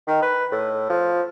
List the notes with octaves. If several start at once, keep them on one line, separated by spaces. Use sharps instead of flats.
D#3
B4
A2
F3